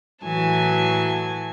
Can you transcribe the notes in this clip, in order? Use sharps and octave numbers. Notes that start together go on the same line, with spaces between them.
A2 E3 F#3 G#5 A5